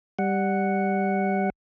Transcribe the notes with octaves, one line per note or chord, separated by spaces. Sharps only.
G3 F#5